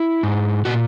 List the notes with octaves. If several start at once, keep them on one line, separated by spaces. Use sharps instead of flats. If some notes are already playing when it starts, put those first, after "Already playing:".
Already playing: E4
G#2
A#2 F#4